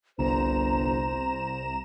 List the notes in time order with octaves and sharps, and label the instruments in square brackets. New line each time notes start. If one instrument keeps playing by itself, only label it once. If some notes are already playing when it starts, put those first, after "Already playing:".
[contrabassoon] G1 [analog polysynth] C2 A#5 E7 [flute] C5